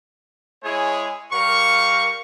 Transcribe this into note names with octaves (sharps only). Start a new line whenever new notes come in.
G#3 E4 G#4 C#5 G#5
G3 A#4 F5 C#6